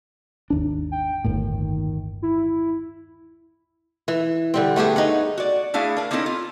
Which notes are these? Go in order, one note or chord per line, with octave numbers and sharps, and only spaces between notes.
G#1 D#2 D4
G5
G1 D#2 A2 D#3
E4
E3
D3 G3 C4
A3 B3 G4 G#4
D#4 C#5 F#5
F#4 D5
A3 D4 E4 G#4 F5
D4 A#4
A#3 C4 C#4 D#4 E4 A4
F4